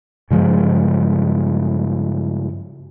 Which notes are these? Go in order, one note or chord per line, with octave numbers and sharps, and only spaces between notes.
G2 C#3 F3 G#3